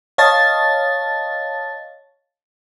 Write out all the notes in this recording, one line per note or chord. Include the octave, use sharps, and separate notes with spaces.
C#5 D#5 F5 A5 A6